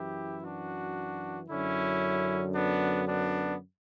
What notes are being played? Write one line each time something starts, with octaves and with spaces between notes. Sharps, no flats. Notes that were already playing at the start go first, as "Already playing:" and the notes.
Already playing: F#2 E3 E4 G4
D4 F#4
F#2 D3 F#3 C#4 E4
B3 D4
B3 D4